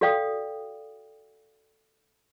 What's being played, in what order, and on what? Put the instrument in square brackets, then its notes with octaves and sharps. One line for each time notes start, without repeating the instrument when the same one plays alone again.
[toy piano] F#4 A4 D5 F5 G5 D#6